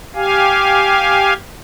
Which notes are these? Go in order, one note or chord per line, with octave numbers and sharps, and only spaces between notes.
G4 F5 G#5